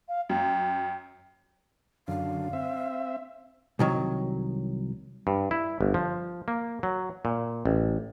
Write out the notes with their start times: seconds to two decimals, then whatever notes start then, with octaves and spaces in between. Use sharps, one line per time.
0.08 F5
0.29 F#2 G5
2.08 F#2 D3 F5
2.53 C4 E5
3.79 C2 D#3 F#3
5.27 G2
5.51 E4
5.81 G1
5.94 F3
6.48 A#3
6.83 F#3
7.25 A#2
7.66 A1